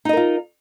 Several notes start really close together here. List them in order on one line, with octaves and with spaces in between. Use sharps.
D#4 D#5 A#4 F4